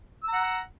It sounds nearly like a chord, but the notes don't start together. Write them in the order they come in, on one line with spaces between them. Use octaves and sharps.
E6 A#5 F#5